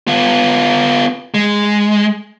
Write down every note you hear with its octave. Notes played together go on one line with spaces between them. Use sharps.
B3 F4
G#3